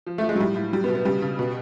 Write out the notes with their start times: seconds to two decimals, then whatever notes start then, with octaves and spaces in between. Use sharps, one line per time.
0.06 F3
0.18 F3 A3
0.29 G#3
0.36 F#3
0.39 A2 G3
0.56 A2
0.73 F#3 G3
0.84 B3
0.88 B2
0.95 B3
1.05 C#3 G3
1.22 C#3
1.39 B2